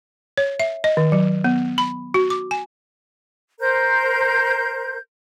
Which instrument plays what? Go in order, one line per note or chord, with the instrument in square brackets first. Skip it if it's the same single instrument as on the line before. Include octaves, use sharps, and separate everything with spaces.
[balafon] C#5
E5
D#5
D#3
F#3
B3
B5
F#4
D6
G#5
[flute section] A#4 C5 G6